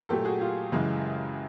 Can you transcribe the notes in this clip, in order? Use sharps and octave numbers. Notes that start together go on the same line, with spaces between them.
A#2 F#3 A3 G4 A4
F#4 G#4
F4 G4
F#2 C#3 E3 G#3